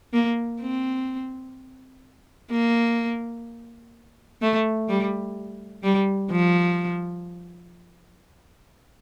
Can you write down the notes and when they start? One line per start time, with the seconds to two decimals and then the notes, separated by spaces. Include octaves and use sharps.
0.13 A#3
0.61 C4
2.50 A#3
4.42 A3
4.89 G3
5.83 G3
6.31 F3